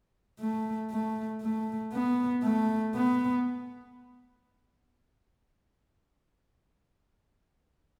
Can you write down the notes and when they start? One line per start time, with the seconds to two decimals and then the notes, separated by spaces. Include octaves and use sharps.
0.40 A3
0.91 A3
1.42 A3
1.93 B3
2.43 A3
2.95 B3